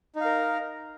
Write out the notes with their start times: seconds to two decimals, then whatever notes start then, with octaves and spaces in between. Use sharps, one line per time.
0.16 D#4
0.20 F5
0.25 A#4